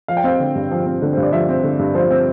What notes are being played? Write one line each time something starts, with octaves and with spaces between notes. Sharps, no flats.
F3 F5
G5
C4 F5
D3
G2
F3
C4
D3
G2 C5
D5
F3 E5
C4
D3
G2
F3 C5
C4